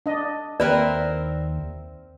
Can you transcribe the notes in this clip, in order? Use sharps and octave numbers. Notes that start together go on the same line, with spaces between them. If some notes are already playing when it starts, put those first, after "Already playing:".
D4 D#5
D#2 C4 A#4 B4 D5 E5